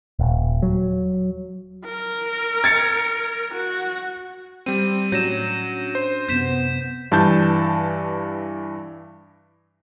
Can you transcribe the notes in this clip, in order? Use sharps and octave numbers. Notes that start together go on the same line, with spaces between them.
D#1
F#3
A#4
G#6 A6 C#7
F#4
G3 C4 D#7
A2 F#3 C#4 D4 G6 A#6 E7
C5
F#2 C3 B3 G6 B6 E7
G2 E3 A5 G6